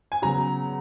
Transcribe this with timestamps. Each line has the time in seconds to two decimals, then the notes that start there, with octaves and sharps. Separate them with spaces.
0.12 G#5
0.22 C#3 F#3 B3 A#5